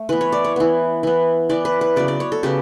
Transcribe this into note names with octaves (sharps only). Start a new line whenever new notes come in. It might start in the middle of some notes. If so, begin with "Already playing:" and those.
Already playing: A3
E3 B3 B4
C#5
D5
C#5
E3 B3
E3 B3
E3 B3 D5
B4
B4
C#3 F#3 B3 D5
D5
C#5
A4
C#3 F#3 B3 G4